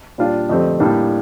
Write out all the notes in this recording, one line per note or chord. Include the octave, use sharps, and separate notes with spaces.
A#2 G3 D4 F4
F2 D3 A3 C4 G4
A2 G3 A#3 D4